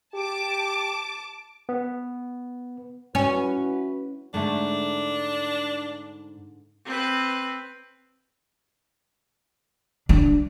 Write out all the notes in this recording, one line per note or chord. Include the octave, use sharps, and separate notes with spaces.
G4 A5 D6
B3
C#4 E4 F#4 B4
G#2 D3 A3 D4
C4 B4
D4